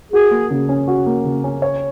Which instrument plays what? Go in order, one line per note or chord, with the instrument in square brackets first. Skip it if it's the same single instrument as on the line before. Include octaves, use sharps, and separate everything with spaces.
[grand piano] F#4 [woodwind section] G#4
[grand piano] A#3
C#3
C#4
F#4
A#3
C#3
C#4
C#5